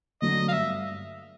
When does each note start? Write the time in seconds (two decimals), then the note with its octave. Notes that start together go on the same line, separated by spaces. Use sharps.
0.22 D3 F#3 A3 D4 D#5
0.48 F5
0.53 G2 E5